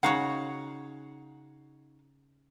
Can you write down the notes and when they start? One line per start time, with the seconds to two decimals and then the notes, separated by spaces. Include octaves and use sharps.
0.03 C#3 D#4 F#4 C#5 F5 F#5